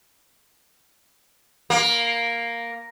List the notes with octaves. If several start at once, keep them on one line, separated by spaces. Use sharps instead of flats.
A#3